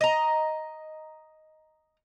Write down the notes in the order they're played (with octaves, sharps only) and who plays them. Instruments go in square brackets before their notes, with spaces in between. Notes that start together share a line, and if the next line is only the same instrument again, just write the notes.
[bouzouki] D#5 A#5